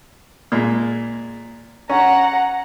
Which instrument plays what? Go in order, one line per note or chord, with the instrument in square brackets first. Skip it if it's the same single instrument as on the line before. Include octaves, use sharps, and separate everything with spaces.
[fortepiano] A#2 G#3
[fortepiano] C#4 [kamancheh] F#5 A#5